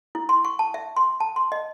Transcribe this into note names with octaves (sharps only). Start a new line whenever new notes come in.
E4
C6
C#6
A5
E5
C6
A5
C6
D#5